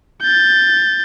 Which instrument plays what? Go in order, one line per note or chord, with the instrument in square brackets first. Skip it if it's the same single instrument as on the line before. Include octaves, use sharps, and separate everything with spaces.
[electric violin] G6 A6